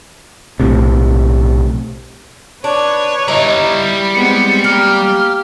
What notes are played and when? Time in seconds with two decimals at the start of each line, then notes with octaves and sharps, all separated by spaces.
0.60 B1 A2 C3
2.64 D4 B4 C#5
3.28 G3 E4 D#5 A#5
4.14 G#3 B3 C4 C#7
4.64 A#3 G4 F6